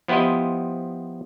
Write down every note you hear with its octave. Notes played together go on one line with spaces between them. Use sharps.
F3 B3 E4 G4 C5 D#5